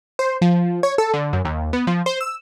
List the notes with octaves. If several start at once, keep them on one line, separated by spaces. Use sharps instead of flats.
C5
F3
C#5
A4
D3
F#2
D#2
B3
F3
C5
E6